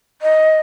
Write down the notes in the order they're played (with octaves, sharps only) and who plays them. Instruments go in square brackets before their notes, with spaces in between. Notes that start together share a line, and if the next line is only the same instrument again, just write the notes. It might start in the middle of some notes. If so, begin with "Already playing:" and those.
[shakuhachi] D#5